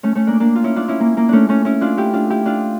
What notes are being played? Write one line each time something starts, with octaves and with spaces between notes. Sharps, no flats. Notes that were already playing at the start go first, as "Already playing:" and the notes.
A3 C#4
A3 C#4
A#3 D4
A#3 D4
F4
C#4 E4
D4 F4
C#4 E4
A#3
A#3
A3 C#4 D4
A3 C#4
C#4 E4
D4 F4
E4 G4
D4 F4
E4 G4
D4 F4